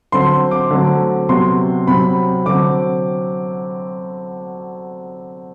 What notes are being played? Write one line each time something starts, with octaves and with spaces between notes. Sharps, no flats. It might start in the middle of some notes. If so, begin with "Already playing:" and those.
D3 F#3 C4 C6
D6
D3 F#3 A3 C4
C3 F#3 B3 C6
C3 F#3 C4 B5
D3 F#3 C4 D6